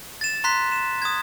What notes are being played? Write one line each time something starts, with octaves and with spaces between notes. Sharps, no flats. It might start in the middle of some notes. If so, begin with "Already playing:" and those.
A6 E7
A#5 C6 F#6 B6
E7
D#6 G#6